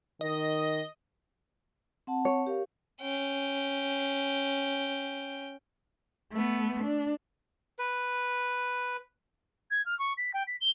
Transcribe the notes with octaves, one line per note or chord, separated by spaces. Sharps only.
D#3 D#5
C4 F#5 A5
C#5
G4 A#4 F5
C#4 G5
A3 B3
D4
B4
G#6
F6
C#6
B6
G5
B6
G7